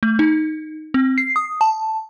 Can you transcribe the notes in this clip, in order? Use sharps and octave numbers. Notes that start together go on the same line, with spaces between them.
A3
D#4
C4
C7
D#6
A5